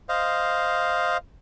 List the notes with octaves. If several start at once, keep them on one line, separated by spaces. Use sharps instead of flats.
C5 D#5 F5